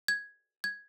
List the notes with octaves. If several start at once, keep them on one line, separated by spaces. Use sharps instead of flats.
G#6
G#6